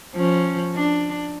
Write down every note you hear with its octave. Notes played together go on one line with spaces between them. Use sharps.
F3 C#4
D4